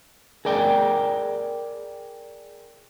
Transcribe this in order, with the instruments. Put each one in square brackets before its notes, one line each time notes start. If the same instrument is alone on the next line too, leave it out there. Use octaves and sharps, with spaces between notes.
[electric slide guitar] G#4 A#4 D5 G5